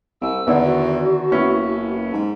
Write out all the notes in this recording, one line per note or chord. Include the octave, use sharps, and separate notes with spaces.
C2 E6
E2 D3 D#3 B3
F#4
F#1 B3 C#4 E4
G#2